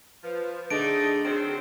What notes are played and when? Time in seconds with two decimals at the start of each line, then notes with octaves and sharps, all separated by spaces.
0.24 F3 B4
0.70 D3 A3 D4 D#4 G#4 D7
1.25 D#3 F#3 C4 D7